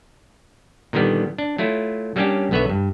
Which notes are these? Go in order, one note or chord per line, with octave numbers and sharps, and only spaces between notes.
A#2 D3 D#3 G3 B3
D4
F#3 A3 E4 F4
F#3 G3 A#3 C#4 D4 G4
B1 D3 B3 B4 C#5 E5
G2